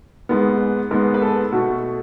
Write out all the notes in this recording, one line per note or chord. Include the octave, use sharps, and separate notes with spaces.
G#2 G#3 B3
G#2 G#3 B3
B4
A4
B2 A3 F#4